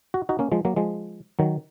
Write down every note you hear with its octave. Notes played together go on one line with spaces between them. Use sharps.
F#4
D#4 F#4
A#3 C#4
F3 G#3
F#3 A#3
F3 G#3
D#3 F#3